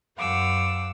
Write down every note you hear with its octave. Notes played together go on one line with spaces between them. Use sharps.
F#2 F5 F#5 D6 E6